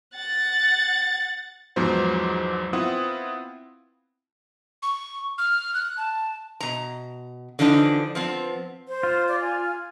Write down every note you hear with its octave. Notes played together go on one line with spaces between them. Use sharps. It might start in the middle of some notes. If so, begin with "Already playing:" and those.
F#5 A6
E2 G#2 F3 F#3 B3 C5
B3 C4 E4 F4 F#5 D#6
C#6
F6
F#6
A5
B2 A#5
D3 E3 F3 D4 D#4
F3 B3 C4
C5
F4
D5
G#5